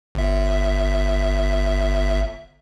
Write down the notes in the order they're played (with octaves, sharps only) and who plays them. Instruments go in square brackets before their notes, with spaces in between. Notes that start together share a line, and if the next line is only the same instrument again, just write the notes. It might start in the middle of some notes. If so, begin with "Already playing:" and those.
[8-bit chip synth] G1 E5